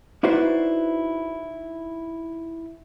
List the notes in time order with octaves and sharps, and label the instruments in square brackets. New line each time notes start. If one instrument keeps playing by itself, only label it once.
[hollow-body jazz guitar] D#4 E4 F#4 B4 C5 D5